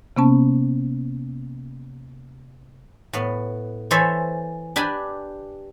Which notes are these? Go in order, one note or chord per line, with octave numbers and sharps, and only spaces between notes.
C3 A#3 B3 C#4 A5
A2 B3
E3 A4 C5 C#5 E5 G#5
D4 G4 B4 G#5 B5